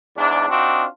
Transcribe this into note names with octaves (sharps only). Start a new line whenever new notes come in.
E2 G#2 D4
C4 D4 D#4 F4 F#4